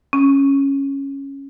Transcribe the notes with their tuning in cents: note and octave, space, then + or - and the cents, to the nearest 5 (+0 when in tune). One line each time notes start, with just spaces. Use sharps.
C#4 -5